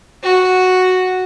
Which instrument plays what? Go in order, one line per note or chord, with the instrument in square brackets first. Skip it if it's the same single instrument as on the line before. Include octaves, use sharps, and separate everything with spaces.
[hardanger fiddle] F#4